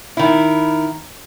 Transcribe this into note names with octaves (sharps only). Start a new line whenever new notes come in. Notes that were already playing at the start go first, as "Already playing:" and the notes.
D#3 E4